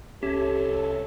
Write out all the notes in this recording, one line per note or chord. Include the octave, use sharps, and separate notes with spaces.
C2 C#4 G4 A4 C#5 E5 A5